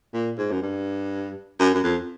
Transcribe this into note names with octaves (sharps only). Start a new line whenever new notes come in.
A#2
G#2
F#2
G2
F#2
F#2
F2